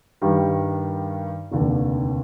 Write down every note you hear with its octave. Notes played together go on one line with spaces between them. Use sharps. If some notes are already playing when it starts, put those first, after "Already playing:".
G2 D#3 G3
F1 D#2 D3